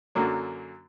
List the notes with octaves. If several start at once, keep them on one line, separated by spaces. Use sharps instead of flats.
F#2 D3 F#3 A#3